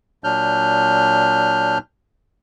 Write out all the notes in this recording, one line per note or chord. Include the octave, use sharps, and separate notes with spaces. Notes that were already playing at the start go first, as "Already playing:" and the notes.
A#2 F#3 D4 F6 G6